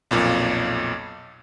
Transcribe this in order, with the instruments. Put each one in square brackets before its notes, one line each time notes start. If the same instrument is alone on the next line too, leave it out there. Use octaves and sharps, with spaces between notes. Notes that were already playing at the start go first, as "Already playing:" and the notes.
[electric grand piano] B1 F2 A#2